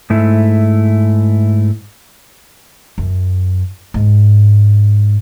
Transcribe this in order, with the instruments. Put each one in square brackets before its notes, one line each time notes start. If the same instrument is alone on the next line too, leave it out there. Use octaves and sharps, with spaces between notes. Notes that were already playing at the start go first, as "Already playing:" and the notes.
[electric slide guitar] G#2 A3 E4
[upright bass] F#2
G#2